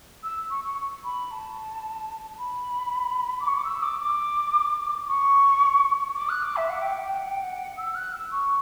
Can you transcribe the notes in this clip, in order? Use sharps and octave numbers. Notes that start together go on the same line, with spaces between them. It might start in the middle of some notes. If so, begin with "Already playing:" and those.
E6
C#6
C#6
B5
A5
B5
D6
C#6
D6
E6
D6
D6
C#6
D6
F#6
D6
E5
F#5
G5
F#5
G5
F#5
G5
F#5
E6
F#6
E6
C#6